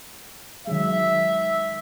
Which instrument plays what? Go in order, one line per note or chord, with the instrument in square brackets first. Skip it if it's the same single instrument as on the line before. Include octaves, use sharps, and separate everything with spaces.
[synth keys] D#3 F#3 G#3 [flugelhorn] E5